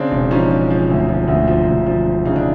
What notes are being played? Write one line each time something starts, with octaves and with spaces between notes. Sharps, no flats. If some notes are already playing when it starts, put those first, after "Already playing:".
Already playing: C#3 C4 D4
E1
F3 C#4 D#4
F3
F3
D2
F3
D2
F3
D2
F3
F3
C#3 D#4
D4